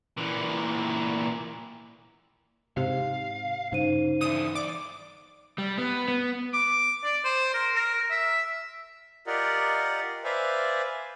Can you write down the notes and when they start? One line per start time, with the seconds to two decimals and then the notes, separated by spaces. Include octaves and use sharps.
0.18 A#2 E3
2.77 G#2 C3 F5
3.72 G2 C#3 D#4 C5 D#7
4.21 D3 E3 D#6
4.55 B1 D5 D6
5.58 G3
5.78 B3
6.08 B3
6.53 D6
7.04 D5
7.25 C5
7.54 A#4
7.75 A#4
8.10 E5
9.27 F4 G4 A#4 D5 D#5 F#5
10.24 B4 C5 D5 E5 F5 G#5